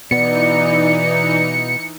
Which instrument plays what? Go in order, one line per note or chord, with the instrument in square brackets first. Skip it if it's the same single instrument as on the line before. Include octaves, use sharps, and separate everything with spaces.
[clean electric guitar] B2 B3 [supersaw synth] E3 D#4 [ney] D5 [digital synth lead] C#7